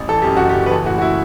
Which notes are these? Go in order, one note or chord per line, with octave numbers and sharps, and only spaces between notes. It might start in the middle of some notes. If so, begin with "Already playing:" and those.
Already playing: A1
E3 A4
F#2 G4
F#1 F#4
G4
F#1
B4
E3 A4
A2 F#4
F#4
E4